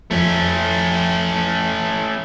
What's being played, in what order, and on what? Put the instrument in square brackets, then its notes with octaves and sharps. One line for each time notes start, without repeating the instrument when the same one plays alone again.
[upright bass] F2 F3 [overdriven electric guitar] A3 C#4